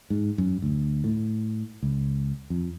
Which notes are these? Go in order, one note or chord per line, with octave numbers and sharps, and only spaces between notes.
G#2
F#2
D2
A2
C#2
F2